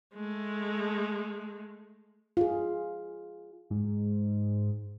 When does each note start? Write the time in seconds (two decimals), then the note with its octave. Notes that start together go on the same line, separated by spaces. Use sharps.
0.14 G#3 A3
2.37 F4 G#4
3.70 G#2